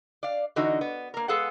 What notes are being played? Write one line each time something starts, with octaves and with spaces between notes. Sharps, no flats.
D5 F5
D3 E3 D#4 F#4
B3
A#3 A#4
G#3 B3 G#4 A4 F5 F#5